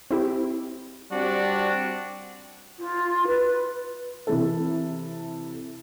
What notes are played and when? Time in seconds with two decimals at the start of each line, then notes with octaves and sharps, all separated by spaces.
0.11 C4 E4 G4
1.11 G3 C4 D4 F#4
2.79 F4
3.26 B4
4.27 C3 E3 E4 A4